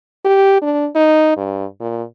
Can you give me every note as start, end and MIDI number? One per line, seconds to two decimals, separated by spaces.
0.25 0.61 67
0.62 0.88 62
0.95 1.36 63
1.37 1.65 43
1.81 2.03 46